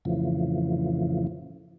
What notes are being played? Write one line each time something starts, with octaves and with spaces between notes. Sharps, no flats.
F2 A2 C#3 E3 F3